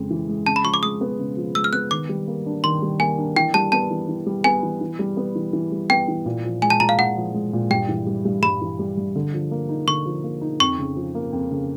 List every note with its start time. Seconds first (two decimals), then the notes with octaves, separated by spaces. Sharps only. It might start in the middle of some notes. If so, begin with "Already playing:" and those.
Already playing: F2 C#3 G#3
0.10 E3
0.28 G#3
0.46 C#3 A5
0.56 B5
0.64 F3 C#6
0.74 D6
0.83 G#3 D#6
1.01 B3
1.19 C#3
1.37 F3
1.55 G#3 E6
1.64 F6
1.73 B3 F#6
1.91 D#3 D6
2.09 G3
2.27 A#3
2.46 D4
2.64 D#3 C6
2.82 G3
3.00 A#3 G#5
3.18 D4
3.36 E3 G5
3.54 G3 A5
3.72 B3 A5
3.91 E3
4.08 E3
4.26 G3
4.44 B3 G#5
4.63 E3
4.81 E3
4.99 G3
5.17 B3
5.35 E3
5.53 E3
5.72 G3
5.90 B3 G5
6.08 E3
6.26 A#2
6.44 F3
6.62 G#3 G#5
6.70 A5
6.80 A#2 A#5
6.89 F5
6.98 A#2 F#5
7.17 F3
7.34 G#3
7.53 A#2
7.71 G2 G5
7.89 E3
8.07 G3
8.25 G2
8.42 G2 B5
8.61 E3
8.79 G3
8.97 G2
9.16 D3
9.34 F3
9.51 A#3
9.69 D#4
9.88 D3 C#6
10.06 F3
10.24 A#3
10.41 D#4
10.60 F2 C#6
10.79 C#3
10.96 F3
11.15 A#3
11.32 F2
11.51 C#3